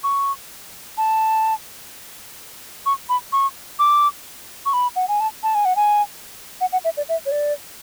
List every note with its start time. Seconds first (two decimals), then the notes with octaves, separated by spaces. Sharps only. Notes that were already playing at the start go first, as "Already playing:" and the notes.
0.04 C#6
0.98 A5
2.86 C#6
3.09 B5
3.32 C#6
3.79 D6
4.66 C#6
4.73 B5
4.96 F#5
5.08 G#5
5.20 A5
5.43 A5
5.55 G#5
5.65 F#5
5.76 G#5
6.61 F#5
6.72 F#5
6.84 E5
6.97 D5
7.09 E5
7.26 C#5
7.31 D5